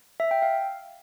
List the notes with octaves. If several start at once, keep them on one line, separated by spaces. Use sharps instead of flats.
E5
G5
F5